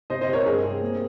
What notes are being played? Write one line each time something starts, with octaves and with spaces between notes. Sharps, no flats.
C3 C5 D#5
C5 D#5
C3
A#4 C#5
G2 G#4
C4
A#3